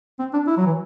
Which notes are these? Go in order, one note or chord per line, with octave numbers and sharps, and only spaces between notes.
C4
D4
E4
F#3
E3